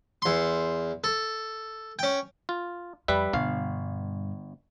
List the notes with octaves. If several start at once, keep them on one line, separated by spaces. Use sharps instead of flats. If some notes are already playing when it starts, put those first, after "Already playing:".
E2 C6
A4
C#4 G5
F4
F2 G3 B4 E5
G1 G2 B2 F5